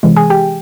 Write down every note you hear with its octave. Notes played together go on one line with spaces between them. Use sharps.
C3 E3 G#3
G#4 G#5
G4 G5